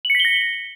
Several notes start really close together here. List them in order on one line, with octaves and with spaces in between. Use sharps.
F#7 C#7 B6 G7 A#6